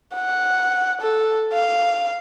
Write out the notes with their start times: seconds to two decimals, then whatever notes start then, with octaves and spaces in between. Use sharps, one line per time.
0.15 F#5
1.01 A4
1.53 F5